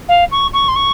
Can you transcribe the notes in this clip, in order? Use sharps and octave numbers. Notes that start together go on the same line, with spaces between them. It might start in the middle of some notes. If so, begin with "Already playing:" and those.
F5
C#6
C#6
C6
C#6